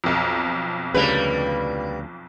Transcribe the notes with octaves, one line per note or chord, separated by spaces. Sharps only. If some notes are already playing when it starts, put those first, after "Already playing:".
B1 F2
D2 C#3 G3 A#3 B4